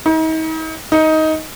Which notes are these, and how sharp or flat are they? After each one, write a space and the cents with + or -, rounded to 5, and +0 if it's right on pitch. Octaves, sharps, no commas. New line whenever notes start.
D#4 +40
D#4 +15